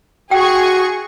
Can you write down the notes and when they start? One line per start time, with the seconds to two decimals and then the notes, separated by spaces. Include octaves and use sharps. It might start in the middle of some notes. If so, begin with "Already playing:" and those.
0.31 F#4 G#4 G5 C#6